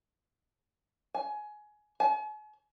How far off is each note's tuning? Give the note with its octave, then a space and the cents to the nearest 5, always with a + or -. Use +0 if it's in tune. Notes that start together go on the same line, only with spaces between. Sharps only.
G#5 +20
G#5 +45